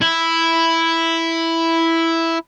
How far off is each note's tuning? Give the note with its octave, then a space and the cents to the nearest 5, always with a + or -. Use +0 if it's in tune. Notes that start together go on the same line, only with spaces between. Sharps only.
E4 +0